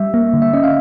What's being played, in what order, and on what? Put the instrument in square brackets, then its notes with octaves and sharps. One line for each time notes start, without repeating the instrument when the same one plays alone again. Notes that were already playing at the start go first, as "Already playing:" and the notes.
Already playing: [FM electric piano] G3 [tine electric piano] E5
[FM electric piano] A#3
D3
[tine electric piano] E5
[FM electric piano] C#4 [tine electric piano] D#5
[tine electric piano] F5